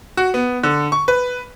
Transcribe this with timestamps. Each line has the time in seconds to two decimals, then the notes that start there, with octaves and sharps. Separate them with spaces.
0.17 F#4
0.34 B3
0.63 D3
0.92 C#6
1.08 B4